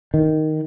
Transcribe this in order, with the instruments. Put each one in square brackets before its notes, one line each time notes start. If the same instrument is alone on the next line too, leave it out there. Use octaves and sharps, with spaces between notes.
[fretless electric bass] D#3